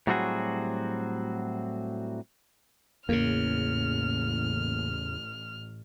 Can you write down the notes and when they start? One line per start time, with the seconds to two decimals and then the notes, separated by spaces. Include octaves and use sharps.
0.07 A2 F#3 G3 C4 F#4 G#4
3.09 A1 E2 C#3 A#3 F6